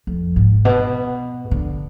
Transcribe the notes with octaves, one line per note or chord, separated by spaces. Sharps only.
F2
G#2
B2
D3